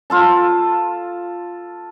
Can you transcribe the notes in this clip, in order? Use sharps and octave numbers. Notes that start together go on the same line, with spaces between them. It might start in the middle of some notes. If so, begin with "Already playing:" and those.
F4 A4 A5